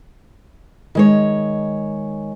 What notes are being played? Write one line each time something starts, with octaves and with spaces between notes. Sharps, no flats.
D#3 G#3 C#5